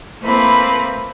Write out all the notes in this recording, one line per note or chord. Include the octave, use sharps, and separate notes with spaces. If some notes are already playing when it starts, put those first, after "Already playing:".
A3 A#3 C4 E4 B4